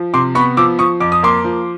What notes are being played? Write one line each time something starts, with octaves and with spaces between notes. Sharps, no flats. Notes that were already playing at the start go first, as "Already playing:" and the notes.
Already playing: F3
C3 C6 D6
B3 B5 C#6
F3 D6 E6
F3 C#6 D#6
F2 D6
D#6
A#3 C6 D6
F3